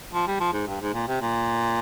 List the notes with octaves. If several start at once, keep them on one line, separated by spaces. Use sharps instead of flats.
F3
G3
F3
G#2
G2
G#2
A#2
C3
A#2